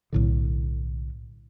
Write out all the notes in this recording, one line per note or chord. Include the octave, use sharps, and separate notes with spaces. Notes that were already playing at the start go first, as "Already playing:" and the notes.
B1 A2 D3